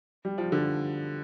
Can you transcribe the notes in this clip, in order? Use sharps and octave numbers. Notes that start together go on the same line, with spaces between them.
G3
F3
D3